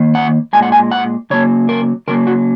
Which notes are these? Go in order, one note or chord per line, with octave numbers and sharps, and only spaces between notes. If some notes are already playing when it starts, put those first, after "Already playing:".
Already playing: D#3 A#3
F#5
A#2 G#3 G#5
F#5
G#5
F#5
C#3 F#3 A#3 C#5
A#4
C#3 F#3 A#3 A#4
F#4